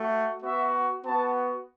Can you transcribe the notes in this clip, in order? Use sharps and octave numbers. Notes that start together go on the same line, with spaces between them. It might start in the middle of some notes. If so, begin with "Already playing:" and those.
Already playing: A3 F#4
B3 F#4 E5
B3 F#4 A5